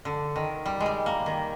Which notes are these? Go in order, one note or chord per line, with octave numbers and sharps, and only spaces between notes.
D3
D#3
G3
G#3
G3
A#3
D#3